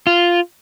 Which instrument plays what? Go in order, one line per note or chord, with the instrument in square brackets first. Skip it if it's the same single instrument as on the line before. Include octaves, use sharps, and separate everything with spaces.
[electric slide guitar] F4